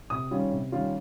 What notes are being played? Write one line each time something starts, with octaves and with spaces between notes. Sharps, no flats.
C3 D#6
D#3 G3 C#4 F4
C3
D#3 G3 C#4 F4